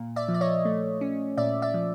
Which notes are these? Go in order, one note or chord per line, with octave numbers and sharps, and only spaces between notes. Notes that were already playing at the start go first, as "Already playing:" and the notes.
Already playing: A#2
D5 E5
F3
D5
C#5 D#5
A3
C#4
A#2 D5 E5
D5 E5
F3